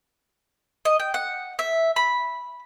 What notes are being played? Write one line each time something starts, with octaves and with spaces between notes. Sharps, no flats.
D#5
G5
F#5
E5
B5